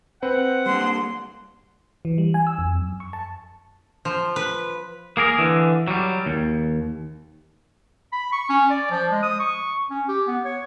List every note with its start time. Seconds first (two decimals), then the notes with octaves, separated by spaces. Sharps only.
0.22 C4 B4 C5 F#5
0.66 G3 A#3 D4 C6
2.05 E3
2.18 G3
2.34 G#5
2.47 E6
2.59 F2
2.76 F#2
3.00 C#6
3.13 A5
4.05 F3
4.36 B4
5.17 A#3 G#4 A#4
5.38 D3 E3
5.88 F#3 G3
6.26 D#2
8.13 B5
8.32 C#6
8.49 C#4
8.71 D5
8.91 F3
9.12 G#3
9.23 D#6
9.40 C#6
9.90 C#4
10.08 G4
10.27 B3
10.45 C#5